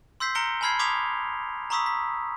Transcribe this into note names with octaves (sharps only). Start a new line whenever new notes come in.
C6 E6 G6 B6 C7
A#5 F6 A#6 C#7 D7 G7
G#5 A5 B5 F6 G#6 C7
C6 D6 D#6 G#6 B6 F7
A#5 B5 C#6 D#6 E6 B6
B6